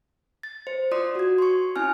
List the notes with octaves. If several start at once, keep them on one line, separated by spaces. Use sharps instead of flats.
A6
C5
F4 D5 C6 D#6
F#4 G#6
C6 C#6
C#4 E4 G#5 F6